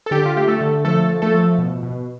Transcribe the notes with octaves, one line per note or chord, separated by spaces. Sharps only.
A4
D3 G4
F4
A3 G4
A3 A4
D3
F3 A3 A4
F3
A3 A4
F3
B2
B2